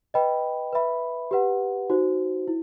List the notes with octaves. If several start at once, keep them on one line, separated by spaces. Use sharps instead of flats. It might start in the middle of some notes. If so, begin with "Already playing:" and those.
B4 D#5 G5 B5
B4 E5 B5
G4 B4 F#5
D#4 F#4 C5
E4